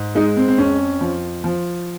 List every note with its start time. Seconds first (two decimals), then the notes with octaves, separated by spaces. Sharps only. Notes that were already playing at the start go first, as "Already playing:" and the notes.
Already playing: G#2
0.15 G#3 D#4
0.37 C4
0.48 C4
0.58 F2 C#4
1.01 F3
1.44 F3